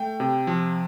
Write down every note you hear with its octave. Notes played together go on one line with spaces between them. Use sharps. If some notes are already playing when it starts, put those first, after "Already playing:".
Already playing: A3 G5
C3
F3